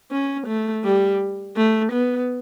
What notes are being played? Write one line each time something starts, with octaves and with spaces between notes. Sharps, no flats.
C#4
A3
G3
A3
B3